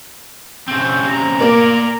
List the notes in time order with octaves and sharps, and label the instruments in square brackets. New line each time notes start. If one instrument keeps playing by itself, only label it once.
[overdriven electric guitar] C#3 C4 [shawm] G5
[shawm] A#5
[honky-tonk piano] A#3 [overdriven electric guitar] A#4 D5